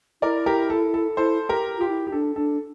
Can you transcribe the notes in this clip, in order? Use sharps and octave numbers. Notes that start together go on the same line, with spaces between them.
E4 A#4 D5
G4 A#4
A4
A4
E4 A4 C5
G4 A#4
F4 G4
E4
G4
D4 A4
D4 A4